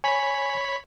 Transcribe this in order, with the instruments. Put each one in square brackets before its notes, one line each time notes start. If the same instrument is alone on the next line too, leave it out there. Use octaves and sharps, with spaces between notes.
[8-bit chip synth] C#5 B5 B6 [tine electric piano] G#5